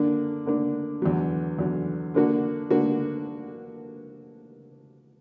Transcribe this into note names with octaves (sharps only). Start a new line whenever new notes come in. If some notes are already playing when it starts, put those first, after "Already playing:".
Already playing: D3 A#3 D4
D3 A#3 D4
E2 D3 F#3
E2 D3 F#3
D3 A#3 D4 F#4
D3 A#3 D4 F#4